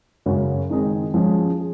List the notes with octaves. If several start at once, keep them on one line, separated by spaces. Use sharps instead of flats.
F#2 C#3 F#3 C#4 F#4
D#3 G#3 C4 D#4 G#4
F3 G#3 C#4 G#4
G#4